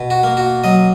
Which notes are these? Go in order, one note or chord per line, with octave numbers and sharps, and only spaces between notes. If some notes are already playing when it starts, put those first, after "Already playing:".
Already playing: B2
F#4
A#3
F#4
F#3 D#5